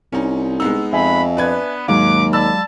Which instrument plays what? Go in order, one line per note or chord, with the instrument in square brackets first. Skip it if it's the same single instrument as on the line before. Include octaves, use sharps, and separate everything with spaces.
[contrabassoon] C2 [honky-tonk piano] C#4 D#4
[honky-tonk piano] G#3 B3 D#4 [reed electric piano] E6
[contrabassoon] F2 [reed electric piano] E5 G#5 [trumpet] B5
[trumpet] B3 [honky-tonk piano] D4 B4 G#6
[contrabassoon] D#2 [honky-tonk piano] G#2 [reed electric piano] F#3 G#3 F5 [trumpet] D6
[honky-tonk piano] D5 B5 E6 [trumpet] A5